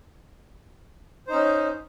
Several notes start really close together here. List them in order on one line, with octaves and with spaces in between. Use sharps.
C5 D#4 C#4